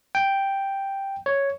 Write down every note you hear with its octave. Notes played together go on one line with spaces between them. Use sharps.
G5
C#5